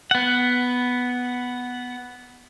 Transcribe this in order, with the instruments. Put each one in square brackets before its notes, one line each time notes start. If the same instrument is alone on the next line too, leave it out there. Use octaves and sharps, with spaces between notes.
[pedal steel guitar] B3 F#5